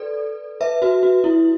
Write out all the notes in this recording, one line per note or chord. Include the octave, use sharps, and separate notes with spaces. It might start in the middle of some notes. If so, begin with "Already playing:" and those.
Already playing: A4 B4 D5
B4 E5
F#4 B4
F#4
E4